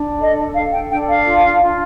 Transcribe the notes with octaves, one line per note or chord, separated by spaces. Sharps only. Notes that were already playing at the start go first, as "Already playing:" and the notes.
Already playing: D4
A4 D#5
A4 F5
G5
D4 G5
F5
F4
F4